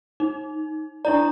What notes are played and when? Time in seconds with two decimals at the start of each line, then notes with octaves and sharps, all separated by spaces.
0.20 D#4
1.05 D4 E4 D5 A#5